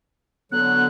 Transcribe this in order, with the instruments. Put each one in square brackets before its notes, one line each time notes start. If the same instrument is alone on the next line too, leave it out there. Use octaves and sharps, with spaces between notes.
[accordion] D3 F#3 [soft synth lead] B3 [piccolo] F#6